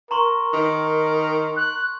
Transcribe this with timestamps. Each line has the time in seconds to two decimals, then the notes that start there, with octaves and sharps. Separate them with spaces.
0.11 A#4 A#5 C6 C#6
0.53 D#3
1.56 F#6